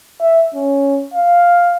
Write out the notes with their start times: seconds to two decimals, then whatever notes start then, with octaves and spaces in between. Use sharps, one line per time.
0.21 E5
0.54 C#4
1.14 F5